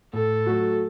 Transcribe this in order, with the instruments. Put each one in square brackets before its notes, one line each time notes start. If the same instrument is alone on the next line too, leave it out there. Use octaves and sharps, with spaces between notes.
[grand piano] A2 [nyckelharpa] A4
[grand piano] F#3 A3 F#4